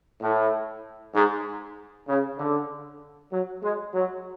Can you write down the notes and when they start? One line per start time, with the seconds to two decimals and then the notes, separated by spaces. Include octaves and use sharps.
0.21 A2
1.14 G#2
2.08 C#3
2.39 D3
3.32 F#3
3.63 G#3
3.94 F#3